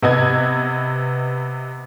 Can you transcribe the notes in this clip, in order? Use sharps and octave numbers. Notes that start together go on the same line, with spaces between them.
C3 B3 D#5 G#6